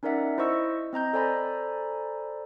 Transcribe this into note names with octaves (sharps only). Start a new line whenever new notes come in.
C#4 D#4 A#4 D5 E5 F#5
E4 C5 D#5 C#6 E6
C4 D#5 A#5 G6
A4 C5 D5 G#5 A#5 B5